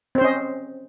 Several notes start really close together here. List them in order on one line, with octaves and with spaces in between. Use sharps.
C4 C5 C#4 D#5